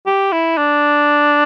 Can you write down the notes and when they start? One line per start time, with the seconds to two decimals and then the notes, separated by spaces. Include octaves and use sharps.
0.06 G4
0.32 E4
0.57 D4